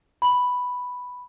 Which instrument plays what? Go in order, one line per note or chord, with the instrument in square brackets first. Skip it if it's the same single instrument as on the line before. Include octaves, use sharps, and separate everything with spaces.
[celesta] B5